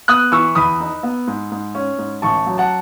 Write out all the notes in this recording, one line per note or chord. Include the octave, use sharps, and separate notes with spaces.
B3 D#6 F#6
E3 C#6 E6
E2 B5 D#6
D#4
B3
G#2
G#2
C#4
G#2
A1 A5 C#6
F#3
F#5 A5